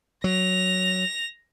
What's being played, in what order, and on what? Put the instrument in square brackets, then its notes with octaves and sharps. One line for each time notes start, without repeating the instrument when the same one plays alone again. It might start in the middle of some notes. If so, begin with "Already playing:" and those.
[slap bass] F#3 [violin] A#6 F7